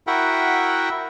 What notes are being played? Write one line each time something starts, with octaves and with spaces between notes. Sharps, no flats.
E4 F#4 A#4 E5 F#5 G5